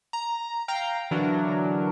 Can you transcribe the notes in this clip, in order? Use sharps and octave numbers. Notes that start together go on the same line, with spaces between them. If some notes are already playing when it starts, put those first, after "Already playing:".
A#5
F5 G5 A#5
D3 E3 F#3 D4 A#4